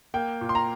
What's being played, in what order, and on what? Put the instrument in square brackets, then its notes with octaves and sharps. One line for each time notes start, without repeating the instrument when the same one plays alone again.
[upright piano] A#3 G5
A#2
C6
A#5